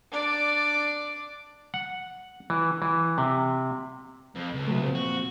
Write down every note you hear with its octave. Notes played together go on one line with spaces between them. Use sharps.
D4 D5
F#5
E3
E3
C3
F2
C#2
C3 F#3 A3
F2 A#2 C4
F#4